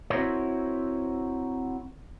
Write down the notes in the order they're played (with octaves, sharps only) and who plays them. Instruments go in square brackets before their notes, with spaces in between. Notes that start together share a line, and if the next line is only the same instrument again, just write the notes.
[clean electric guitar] C4 E4 F#4 A#4 C5 C#5